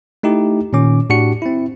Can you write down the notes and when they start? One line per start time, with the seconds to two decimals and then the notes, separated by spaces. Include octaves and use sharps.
0.23 A3 D#4 E4 G4
0.73 A#2 D#3 C#4 D6
1.10 A2 D4 F#4 G4 C#7
1.42 C4 E4